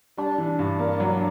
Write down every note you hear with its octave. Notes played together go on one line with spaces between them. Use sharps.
G3 D4
E3
G2
A#3
F#3